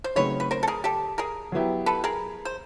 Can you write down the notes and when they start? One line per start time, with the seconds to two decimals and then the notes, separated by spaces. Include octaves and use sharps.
0.04 C5
0.16 C#3 F#3 A3 C4 D#4 B4 C#5
0.40 B4
0.51 A#4 C5
0.63 A4
0.68 G#4 A#4
0.84 G4 A4
1.18 G#4 A#4
1.52 F#3 B3 E4 G4
1.86 A4 B4
2.04 G#4 A#4
2.45 C5